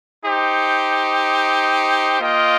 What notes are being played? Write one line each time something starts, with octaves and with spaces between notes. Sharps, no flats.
D#4 G4 C5
A#3 F4 D#5 G5